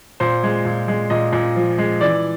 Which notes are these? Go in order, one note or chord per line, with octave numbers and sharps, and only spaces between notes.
A#2 C5
G#3
A#2
G#3
A#2 D#5
A#2
F3
G#3
E3 D5